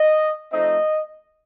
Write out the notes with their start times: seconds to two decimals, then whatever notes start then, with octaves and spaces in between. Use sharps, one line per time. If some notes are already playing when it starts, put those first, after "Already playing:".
Already playing: D#5
0.53 F3 A3 C4 D#4 D#5